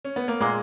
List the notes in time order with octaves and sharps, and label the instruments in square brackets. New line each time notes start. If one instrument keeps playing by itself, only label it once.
[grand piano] C#4
B3
A#3
[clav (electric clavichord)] A#2 A#3 [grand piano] G#3